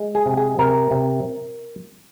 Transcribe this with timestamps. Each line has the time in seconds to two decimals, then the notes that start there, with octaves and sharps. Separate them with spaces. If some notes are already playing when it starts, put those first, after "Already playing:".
Already playing: G#3
0.15 G#4
0.26 C3
0.37 G#4
0.59 C3 A#4
0.91 C3